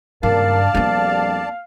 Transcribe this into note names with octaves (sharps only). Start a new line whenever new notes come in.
G#1 G2 C#3 A#3 A#4 D5 F5 A5
A#1 F2 G3 A#3 B3